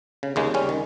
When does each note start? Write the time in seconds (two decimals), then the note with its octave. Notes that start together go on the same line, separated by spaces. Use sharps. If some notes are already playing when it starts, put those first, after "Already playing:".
0.23 C#3
0.36 D#2 C#3 G#3
0.54 G3 C#4
0.69 D#3